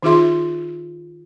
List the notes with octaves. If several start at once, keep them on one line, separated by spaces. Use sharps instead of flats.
D#3 D#4 F4 G#4 E5 C6